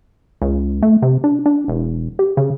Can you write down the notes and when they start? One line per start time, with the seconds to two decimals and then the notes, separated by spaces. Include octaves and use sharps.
0.42 C#2
0.82 A3
1.02 C3
1.24 D4
1.46 D4
1.68 E1
2.19 G4
2.37 C#3